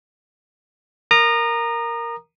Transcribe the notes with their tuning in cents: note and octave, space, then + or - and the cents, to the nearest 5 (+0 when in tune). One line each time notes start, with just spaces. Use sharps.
A#4 +0 A#5 +0 D#6 -30